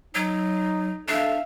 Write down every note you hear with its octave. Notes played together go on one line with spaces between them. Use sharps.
F#3 D#4
D4 A4 E5 F5